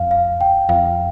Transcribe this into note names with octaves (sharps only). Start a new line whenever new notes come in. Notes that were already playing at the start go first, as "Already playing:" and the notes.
Already playing: F2 F5
F5
G5
F2 F5